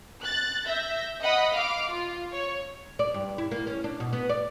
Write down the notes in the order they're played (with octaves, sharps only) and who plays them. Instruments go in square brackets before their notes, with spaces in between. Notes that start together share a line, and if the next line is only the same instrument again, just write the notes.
[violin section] F#6 A6
E5 G6 A#6
D#5 F#5 B5 D#6
F5 D6
F4
C#5
[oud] D5
G2
E4
A#3
C#4
D4
B2
B3
D5